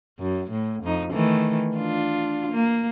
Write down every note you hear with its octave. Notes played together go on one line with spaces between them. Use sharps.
F#2
A2
F2 D#4
D#3 E3 A3
D4 F4
A#3